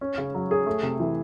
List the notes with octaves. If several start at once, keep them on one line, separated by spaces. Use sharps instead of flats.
C#4
C#3
F#3
G#4
A3
C3
E3